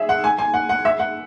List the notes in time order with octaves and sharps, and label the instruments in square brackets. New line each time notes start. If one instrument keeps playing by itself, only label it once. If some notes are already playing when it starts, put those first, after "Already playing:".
Already playing: [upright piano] G#4 E5
F#5
G#5
G#5
F#5
F#5
E5
F#5